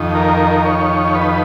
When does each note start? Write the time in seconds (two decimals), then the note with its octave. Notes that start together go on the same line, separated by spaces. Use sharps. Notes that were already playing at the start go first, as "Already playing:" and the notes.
Already playing: F2 D#3
0.15 A#4
0.65 C#5
1.15 B4